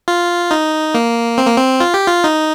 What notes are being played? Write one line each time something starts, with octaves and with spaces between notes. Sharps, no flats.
F4
D#4
A#3
C4
A#3
C4
F4
G4
F4
D#4